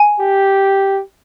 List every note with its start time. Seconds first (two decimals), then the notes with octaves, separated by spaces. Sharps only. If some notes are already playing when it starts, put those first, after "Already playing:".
Already playing: G#5
0.20 G4